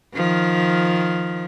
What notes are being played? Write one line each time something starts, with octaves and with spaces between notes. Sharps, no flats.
D#3 F3